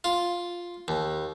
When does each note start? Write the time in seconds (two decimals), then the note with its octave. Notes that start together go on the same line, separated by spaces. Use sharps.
0.04 F4
0.88 D#2